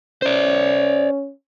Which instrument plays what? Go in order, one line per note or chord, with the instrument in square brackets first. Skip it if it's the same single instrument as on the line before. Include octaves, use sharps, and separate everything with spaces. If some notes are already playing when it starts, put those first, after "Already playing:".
[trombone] C#4 [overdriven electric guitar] C5 D5